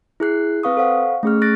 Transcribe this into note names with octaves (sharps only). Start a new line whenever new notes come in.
E4 G#4 F#6 C7
C4 B4 F5 C#6 D#6
A4 C5 F5 F#5 C#6
A3 C#4 G#4 C#6 F6
C#6 F#6 A6 A#6 D7